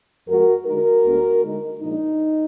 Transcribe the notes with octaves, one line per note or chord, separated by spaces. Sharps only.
F2 F3 G#3 F#4 A#4
D3 G#3 D#4 F#4 A#4
D2 D3 G#3 B3 D4
D3 G#3 D#4
A#2 F3 G#3 D4 D#4